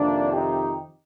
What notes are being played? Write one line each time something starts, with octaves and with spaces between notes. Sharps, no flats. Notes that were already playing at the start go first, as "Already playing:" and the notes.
Already playing: F2 C3 D#3 A#3 D4
D#4 G4